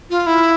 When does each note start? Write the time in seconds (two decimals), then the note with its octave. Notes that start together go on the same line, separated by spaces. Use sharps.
0.10 F4
0.27 E4